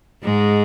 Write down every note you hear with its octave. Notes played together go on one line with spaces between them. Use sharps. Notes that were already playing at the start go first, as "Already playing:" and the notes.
G#2 G#3